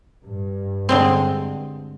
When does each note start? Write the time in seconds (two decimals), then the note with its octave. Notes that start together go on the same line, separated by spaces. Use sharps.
0.23 G2
0.89 D3 G#3 C4